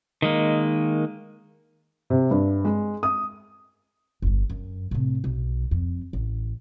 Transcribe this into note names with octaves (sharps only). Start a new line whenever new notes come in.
D#3 G#3 A#3
C3
G2
G#3
D#6
G1 G2
F#2
A2 C3
B1
F2
A1